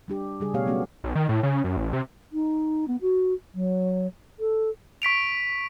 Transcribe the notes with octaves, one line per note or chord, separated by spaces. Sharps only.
G3 D4 G4
C#3 G3 G#4
B2 A3 B3 G4 C#5 F5
F#3 A3 B3 C#4 F#4
B1
D#3
A2
C#3
F#2
A1
C3
D#4
B3
F#4
F#3
A4
C#6 B6 D7 F7